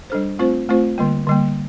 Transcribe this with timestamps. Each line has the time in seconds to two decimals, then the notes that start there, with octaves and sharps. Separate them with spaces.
0.10 G3 D4 A4 C5
0.39 A3 C4 F4 C5
0.69 A3 C4 F4 C5
0.98 D3 G3 A#3
1.27 D3 G3 A#3